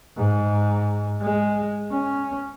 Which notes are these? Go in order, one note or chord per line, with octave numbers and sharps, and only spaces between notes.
G#2
G#3
C#4